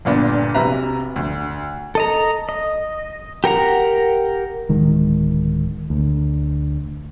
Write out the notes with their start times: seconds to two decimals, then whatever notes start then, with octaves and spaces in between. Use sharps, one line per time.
0.05 G1 A#2 B3 D4
0.55 B1 C3 B4 E5 A#5
1.16 D2
1.95 A4 D#5 A#5
2.49 D#5
3.44 G4 A#4 F#5 A#5
4.69 D1 D#3 G#3
5.90 D2